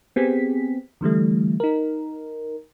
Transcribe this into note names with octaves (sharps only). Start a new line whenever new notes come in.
B3 C4 G4 G#4 B6
D3 E3 G3 A3
D#4 A#4